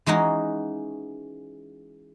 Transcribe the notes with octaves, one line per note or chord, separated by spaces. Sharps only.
E3 G#3 C#4 D#4 F#4